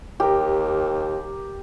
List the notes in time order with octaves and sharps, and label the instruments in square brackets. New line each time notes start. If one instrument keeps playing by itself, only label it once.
[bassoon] D#2 [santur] G4 A#4